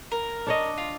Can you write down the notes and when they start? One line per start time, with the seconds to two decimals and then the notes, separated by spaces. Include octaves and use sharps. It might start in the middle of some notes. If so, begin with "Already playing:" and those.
0.12 A#4
0.47 D4 C#5 D#5
0.77 F4